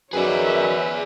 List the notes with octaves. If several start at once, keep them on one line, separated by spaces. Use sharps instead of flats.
F#2 D#3 G#4 B4 C#5 D5 E5